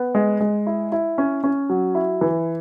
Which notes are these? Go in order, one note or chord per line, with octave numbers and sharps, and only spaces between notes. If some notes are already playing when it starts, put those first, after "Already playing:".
Already playing: B3
G#3
G#3
E4
E4
C#4
C#4
F#3
E4
E3